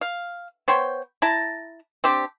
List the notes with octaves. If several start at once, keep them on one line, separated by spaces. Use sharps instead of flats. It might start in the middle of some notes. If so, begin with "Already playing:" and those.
F5
B3 C5 C#5 G5
E4 A5 A#5
C4 D4 G4